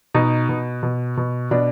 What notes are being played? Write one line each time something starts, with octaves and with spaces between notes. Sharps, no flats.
B2 D#4
B2
B2
B2
B2 D4